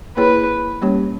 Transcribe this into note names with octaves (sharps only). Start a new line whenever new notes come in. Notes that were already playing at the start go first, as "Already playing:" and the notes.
A#3 E4 G#4 B4 C#5
G3 A#3 C#4 G4 C#5